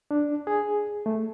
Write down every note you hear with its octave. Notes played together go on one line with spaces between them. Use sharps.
D4
G#4
A3